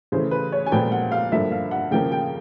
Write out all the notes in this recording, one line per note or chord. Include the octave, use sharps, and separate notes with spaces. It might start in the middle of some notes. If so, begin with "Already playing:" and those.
C#3 E3 A3 C5
B4
C#5
G#5
A#2 F3 G#3 B3 G5
F#5
F5
G2 D3 F3 A#3 E5
F5
F#5
C#3 F3 A#3 G5
G5